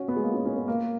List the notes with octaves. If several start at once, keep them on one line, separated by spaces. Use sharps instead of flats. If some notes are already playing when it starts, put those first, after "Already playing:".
Already playing: C#4 F#4
B3
G#3
A#3
C#4
C#4
B3
A#3